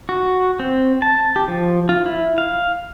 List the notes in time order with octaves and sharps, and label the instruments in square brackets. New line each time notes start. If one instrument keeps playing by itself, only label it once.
[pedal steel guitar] F#4
C4
A5
G4
F3
F4
E4
F5